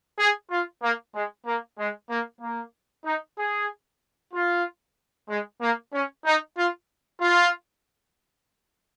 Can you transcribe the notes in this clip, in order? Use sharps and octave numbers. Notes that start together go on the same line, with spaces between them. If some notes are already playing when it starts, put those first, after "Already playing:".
G#4
F4
A#3
G#3
A#3
G#3
A#3
A#3
D#4
G#4
F4
G#3
A#3
C#4
D#4
F4
F4